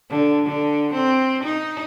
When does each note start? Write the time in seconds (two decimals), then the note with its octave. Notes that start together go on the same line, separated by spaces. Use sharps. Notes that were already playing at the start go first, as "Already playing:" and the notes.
0.10 D3
0.45 D3
0.93 C4
1.44 D#4